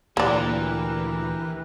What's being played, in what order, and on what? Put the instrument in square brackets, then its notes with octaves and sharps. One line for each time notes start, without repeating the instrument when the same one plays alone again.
[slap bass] D2 A#2 [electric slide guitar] E3 [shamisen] A#3 D5 [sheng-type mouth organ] G4 A#4 B4